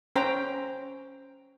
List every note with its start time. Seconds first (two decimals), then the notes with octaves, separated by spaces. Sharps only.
0.16 C#4 C5 G5 A#5